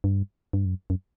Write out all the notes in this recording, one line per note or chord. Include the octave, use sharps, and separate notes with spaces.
G2
G2
F#2
F#2